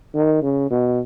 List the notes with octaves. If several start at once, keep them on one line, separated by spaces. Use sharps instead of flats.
D#3
C#3
B2